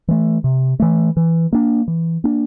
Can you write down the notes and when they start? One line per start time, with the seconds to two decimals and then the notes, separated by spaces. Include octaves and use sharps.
0.08 E3 A3
0.44 C3
0.80 E3 A3
1.17 E3
1.53 A#3 D4
1.88 E3
2.24 A#3 D4